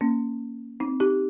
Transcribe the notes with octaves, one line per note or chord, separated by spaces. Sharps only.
A#3 C#4
C4 D#4
D#4 G4